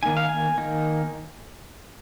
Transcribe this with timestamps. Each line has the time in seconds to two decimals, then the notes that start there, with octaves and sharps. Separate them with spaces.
0.03 D#3 A#3 D#4 G#5
0.17 F5
0.29 G#5
0.58 D#3 A#3 D#4